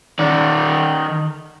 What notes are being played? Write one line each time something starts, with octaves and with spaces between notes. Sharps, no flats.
D#3 D5